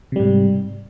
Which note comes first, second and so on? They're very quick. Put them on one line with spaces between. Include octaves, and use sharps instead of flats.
C3 G3 G#2